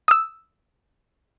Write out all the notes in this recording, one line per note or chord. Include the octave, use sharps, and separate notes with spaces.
D#6 E6